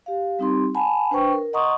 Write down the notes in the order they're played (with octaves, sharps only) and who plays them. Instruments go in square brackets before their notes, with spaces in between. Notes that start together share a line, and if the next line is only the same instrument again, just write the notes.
[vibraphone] G4 F5
G3 C4 D#4 G4 C6
F#5 G#5 A5 B5
D4 B4 C5 G5 C#6
A#4
D#5 F#5 A#5 C6 C#6 D#6